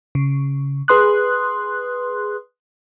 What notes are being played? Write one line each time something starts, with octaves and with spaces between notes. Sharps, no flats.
C#3
G#4 B4 C6 D#6 F#6